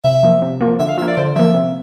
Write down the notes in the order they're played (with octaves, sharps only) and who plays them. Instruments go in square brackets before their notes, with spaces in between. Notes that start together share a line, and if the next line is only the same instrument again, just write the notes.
[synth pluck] C3 [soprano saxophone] E5
[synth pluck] F3 A#3
C3
F3 A#3
[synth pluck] D3 [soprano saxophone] E5
[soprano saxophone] F5
[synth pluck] F3 [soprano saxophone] E5
[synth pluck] A#3
[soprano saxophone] D5
[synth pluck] D3 [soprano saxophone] C5
[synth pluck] F3 A#3 [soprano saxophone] E5
[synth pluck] C3